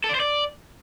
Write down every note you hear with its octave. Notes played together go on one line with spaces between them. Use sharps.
A4
D5
C5
D5